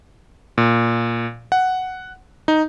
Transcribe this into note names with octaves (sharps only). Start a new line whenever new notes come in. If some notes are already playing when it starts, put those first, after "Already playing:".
A#2
F#5
D#4